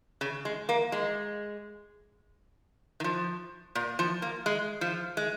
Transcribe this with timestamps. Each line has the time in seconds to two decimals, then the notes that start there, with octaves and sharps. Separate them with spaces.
0.21 C#3
0.45 G#3
0.69 A#3
0.92 G#3
3.00 D#3
3.04 F3
3.75 A#2
3.99 F3
4.22 A#3
4.46 G#3
4.81 F3
5.17 G#3